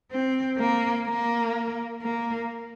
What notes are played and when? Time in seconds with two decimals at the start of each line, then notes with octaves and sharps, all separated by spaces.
0.11 C4
0.58 A#3
1.06 A#3
2.02 A#3